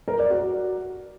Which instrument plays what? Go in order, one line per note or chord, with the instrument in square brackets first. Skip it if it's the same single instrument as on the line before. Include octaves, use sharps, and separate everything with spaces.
[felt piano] A#4
D5
F#4